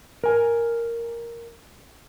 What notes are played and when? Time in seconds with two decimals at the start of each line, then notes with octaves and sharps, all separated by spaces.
0.24 A#4 G#5